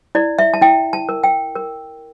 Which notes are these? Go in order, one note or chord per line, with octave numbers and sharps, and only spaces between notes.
E4 D5
E5
A5
E4 G5
A5
A#4
G5
A#4